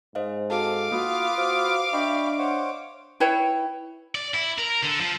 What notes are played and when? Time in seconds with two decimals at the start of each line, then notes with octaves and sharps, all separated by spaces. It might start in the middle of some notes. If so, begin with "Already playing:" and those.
0.15 G#2 C5 D#5 F5
0.50 C4 F#4 A4 F5 A5 D6
0.91 A#3 F4 F#4 B4 D#6
1.38 F#4 C5 F6
1.93 D4 D#5 E5 G5 B5 C#6
2.38 C5 C#5 F#5
3.20 E4 B4 C#5 G5
4.15 D5
4.34 E4
4.58 A#4
4.83 D3
5.00 F3